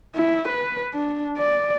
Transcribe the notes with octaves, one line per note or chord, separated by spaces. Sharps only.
E4
B4
D4
D5